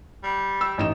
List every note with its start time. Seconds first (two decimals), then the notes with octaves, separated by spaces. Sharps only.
0.24 G3
0.61 E6
0.78 A1 D#4 E7